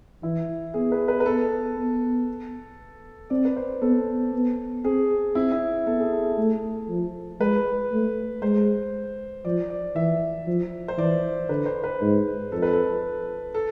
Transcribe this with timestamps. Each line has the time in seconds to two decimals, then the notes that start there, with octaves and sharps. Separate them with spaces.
0.23 E3 E4
0.74 B3 G#4
0.92 B4
1.08 B4
1.20 B4
1.26 B3 A4
1.77 B3
3.30 C4 D5
3.45 B4
3.56 C5
3.82 B3 A4
4.33 B3
4.84 C4 G#4
5.35 C4 E4
5.52 E4
5.87 B3 A4
6.00 G#4
6.12 A4
6.38 A3
6.89 F3
7.40 G#3 B4
7.92 A3
8.42 G#3 C5
9.45 F3 D5
9.70 D5
9.95 E3 E5
10.47 F3
10.88 C5
10.98 E3 D5
11.49 D3 B4
11.66 C5
11.84 B4
12.01 G#2
12.52 F2 A4
12.62 B4
12.73 A4
13.54 A4